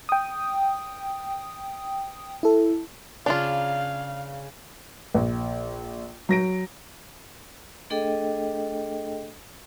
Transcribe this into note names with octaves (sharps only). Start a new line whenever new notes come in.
G5 D#6
E4 A4
C#3 D4 F4 F5 A#5 D6
A#1
F#3 A#6 D7
A3 D4 G#4 A4 D#5 G5